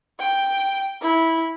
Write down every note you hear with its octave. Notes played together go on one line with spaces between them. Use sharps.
G5
E4